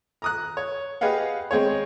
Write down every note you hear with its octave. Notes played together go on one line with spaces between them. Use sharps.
A#5 D#6 F#6
C#5
G4 G#4 B4 D#5 F5 F#5
G#3 C4 G#4 C#5